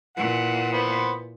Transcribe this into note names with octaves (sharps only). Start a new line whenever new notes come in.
A#2 E3 F#5
B3 B4 C5